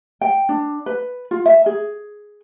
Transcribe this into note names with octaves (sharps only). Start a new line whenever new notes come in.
G5
D4
B4
F4
E5
G#4